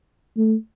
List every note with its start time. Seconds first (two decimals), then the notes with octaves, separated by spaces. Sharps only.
0.37 A3